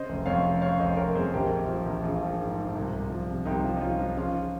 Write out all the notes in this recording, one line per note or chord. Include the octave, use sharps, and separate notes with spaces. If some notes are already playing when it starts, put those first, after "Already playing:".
Already playing: C#3 C5 D#5
F1
F2 C#5 F5
C#3
C#3 C#5 F5
F1 C5 D#5
F1 A#4 C#5
F2 G#4 C5
A#1 G4 A#4
A#1
F3
A#1
A#1 F4 G#4
F3
G#2
G#2
C2
C2
F3
C3
C2 D#4 G4
F3
D#4
F3 C#4 F4
F3
C#3 C#4 F4